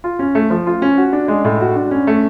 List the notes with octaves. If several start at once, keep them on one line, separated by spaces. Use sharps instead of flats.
F4
C#4
A3
F3
F4
C#4
F#4
D4
G#3
A2
F#4
D4
C#4
A3